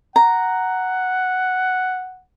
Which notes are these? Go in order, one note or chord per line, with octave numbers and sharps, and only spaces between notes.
F#5 A#5